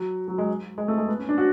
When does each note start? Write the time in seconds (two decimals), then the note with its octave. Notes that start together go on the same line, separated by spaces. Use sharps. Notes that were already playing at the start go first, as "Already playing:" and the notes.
Already playing: F#3
0.28 F#3
0.38 G#3
0.78 G#3
0.88 A3
0.98 G#3
1.08 B3
1.19 C#4
1.29 D4
1.38 F#4